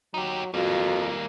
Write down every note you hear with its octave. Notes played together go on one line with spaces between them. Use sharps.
F#3 D#4 G4
F2 G3 A#3 F#4